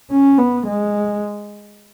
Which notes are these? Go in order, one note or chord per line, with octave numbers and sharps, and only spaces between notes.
C#4
B3
G#3